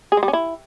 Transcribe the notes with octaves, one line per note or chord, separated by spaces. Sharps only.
G#4
G#3
G3
C#4
E4